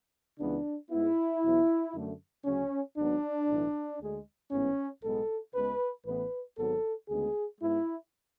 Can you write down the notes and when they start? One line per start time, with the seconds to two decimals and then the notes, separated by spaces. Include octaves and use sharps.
0.39 C#2 C#3 E3 B3 D4
0.90 G#2 G#3 B3 E4
1.42 E2 B2 F#3 B3
1.94 F#2 D3 A3
2.45 D2 C#3 F#3 C#4
2.97 G#1 G#2 F#3 B3 D4
3.49 B1 A2 E3
4.00 D2 D3 G#3
4.51 A1 G#2 E3 B3 C#4
5.03 B1 A2 G#3 B3 A4
5.54 C#2 C#3 G#3 B3 B4
6.06 A1 A2 E3 B3 B4
6.57 G#1 G#2 F#3 B3 A4
7.09 D2 C#3 G#3 B3 G#4
7.60 G#2 G#3 B3 E4